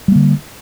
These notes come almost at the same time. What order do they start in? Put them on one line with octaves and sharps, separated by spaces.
G3 A#3 D3